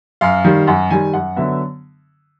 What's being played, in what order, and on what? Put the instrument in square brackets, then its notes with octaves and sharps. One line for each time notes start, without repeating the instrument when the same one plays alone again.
[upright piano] F#2 F5
D#3 G3
F#2 F#5
D#3 G3 G#5
F#2 F#5
D3 F#3 B3 E5